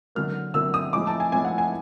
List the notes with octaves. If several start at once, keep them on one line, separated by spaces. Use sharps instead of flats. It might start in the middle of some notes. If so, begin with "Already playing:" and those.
D3 F#3 A#3 F6
D3 F#3 A#3 E6
D#6
A2 F3 G#3 D6
A5
G#5
A2 F3 G#3 G#5
F#5
G#5